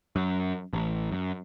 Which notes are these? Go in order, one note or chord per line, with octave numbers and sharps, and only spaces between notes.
F#2
A1
F#2